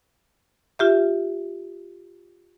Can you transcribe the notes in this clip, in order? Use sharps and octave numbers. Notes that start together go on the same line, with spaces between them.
F4 G4 E5